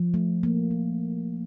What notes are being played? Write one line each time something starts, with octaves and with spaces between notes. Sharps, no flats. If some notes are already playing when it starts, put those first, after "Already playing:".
Already playing: F3
A3
A#3
F3